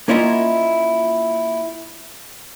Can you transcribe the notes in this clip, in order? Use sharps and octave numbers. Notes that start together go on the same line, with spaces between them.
A#3 C#4 E4 F4 D#5 F#5